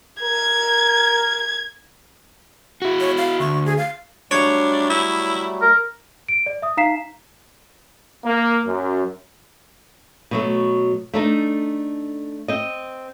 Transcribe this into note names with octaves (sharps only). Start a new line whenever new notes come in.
A#4 G#6
E4 F#4
C#5
F5
D2 C#6
G#4
F5
F#3 G3 A3 D4 C#5
E4
A#4
D7
D5
E5 D#6
D#4 F5 A#5 B6 C7 E7
A#3
F#2
B2 F#3 A3
A3 D4 D#4
C4 D#5